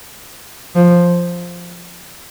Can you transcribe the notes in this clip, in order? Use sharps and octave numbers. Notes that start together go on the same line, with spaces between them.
F3